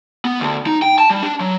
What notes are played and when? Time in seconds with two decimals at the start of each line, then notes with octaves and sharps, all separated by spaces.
0.25 B3
0.40 D2
0.66 D#4
0.82 G5
0.98 A5
1.10 G3
1.22 D4
1.40 F#3